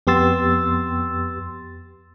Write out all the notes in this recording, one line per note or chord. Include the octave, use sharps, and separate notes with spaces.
F2 B3 G4 C6 E6 A6